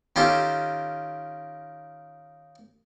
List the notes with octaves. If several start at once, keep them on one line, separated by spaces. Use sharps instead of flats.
D#3 C#4 F4 G4 A4